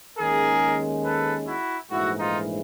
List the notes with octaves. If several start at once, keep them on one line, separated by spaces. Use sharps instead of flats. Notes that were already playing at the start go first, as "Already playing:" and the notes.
D#2 D#3 G#3 C#4 G#4 A#4
A4 B4
E4 F#4
A#1 G#2 E3 A3 E4 F#4
D#4 F4